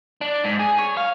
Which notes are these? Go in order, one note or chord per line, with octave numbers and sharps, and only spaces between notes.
D4
G#2
G#4
C#5
F5